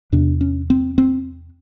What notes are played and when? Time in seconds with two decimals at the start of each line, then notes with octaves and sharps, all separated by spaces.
0.12 E2 C3 D4
0.41 C#4
0.70 C4
0.98 C4